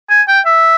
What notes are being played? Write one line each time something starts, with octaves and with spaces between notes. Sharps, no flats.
G#5
G5
E5